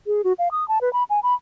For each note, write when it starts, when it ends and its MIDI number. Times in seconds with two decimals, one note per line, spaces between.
0.07 0.22 68
0.24 0.33 66
0.39 0.49 77
0.52 0.67 87
0.68 0.81 81
0.81 0.92 71
0.93 1.03 83
1.10 1.20 80
1.23 1.34 83